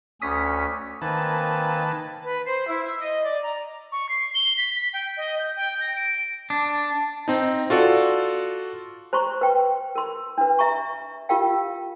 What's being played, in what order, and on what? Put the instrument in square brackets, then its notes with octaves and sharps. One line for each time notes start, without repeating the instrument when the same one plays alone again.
[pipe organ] D2 C#4 [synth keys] D#6 B6
[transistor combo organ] D#3 B4 A5 [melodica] A#3 C4 G#5
[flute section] B4
C5
E4
E5
D#5
D5
A#5
[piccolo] C#6
C7
G7
B6
B6
G5
D#5
G6
G5
A#6
D7
[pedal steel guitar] D4
[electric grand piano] C4 D#4
F4 F#4 A4 D5
[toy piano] C5 A#5 C6 C#6
B4 G5
A#4 C6
D4 B4
E5 A#5 C#6
F4 G4 A#4 F5 G5